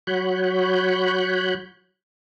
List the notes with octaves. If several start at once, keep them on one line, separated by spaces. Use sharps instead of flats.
F#3 F#4 C#5 B5 F#6 G6